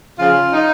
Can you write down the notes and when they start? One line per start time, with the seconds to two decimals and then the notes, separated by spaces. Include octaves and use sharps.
0.18 C#3 F3 F4
0.53 D#4